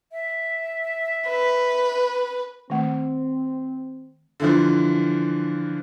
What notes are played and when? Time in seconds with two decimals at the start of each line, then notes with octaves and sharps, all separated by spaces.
0.12 E5
1.27 B4
2.70 D#3 A3 C4
4.40 D3 E3 F3